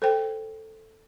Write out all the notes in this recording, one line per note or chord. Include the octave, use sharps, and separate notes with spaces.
A4 C5 G5